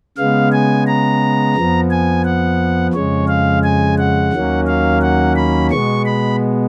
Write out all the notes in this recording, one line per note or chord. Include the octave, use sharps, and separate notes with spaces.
C#3 G#3 B3 F5
G#5
A#5
F2 F3 B3
G#5
F#5
F2 C#3 G#3 C#5
F5
G#5
F#5
D#2 D#3 F#3 A#3 C#4
F5
F#5
B5
B2 G#3 B3 C#6
B5